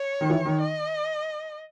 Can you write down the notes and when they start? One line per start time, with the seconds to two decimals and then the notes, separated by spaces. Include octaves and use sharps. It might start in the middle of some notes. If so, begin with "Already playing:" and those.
Already playing: C#5
0.21 D#3
0.30 E3
0.45 D#3
0.61 D#5